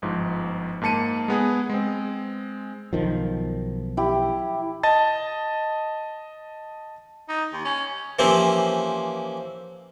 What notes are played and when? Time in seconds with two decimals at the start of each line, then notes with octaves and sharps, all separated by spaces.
0.02 G1 G#2 F3
0.82 G#2 A#3 A5 C#7 D#7
1.28 G#3 B3 G#4
1.69 G#3 C4
2.93 B1 D#3 F3
3.97 E4 G4
4.83 D#5 A5 A6
7.29 D#4
7.52 D#2
7.65 C#4
8.19 E3 F3 A#3 C4 C#4 G4